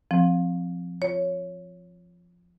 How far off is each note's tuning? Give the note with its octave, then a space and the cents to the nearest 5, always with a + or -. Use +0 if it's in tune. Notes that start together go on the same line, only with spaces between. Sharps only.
F3 +0 C4 +0
F4 +0 C#5 +0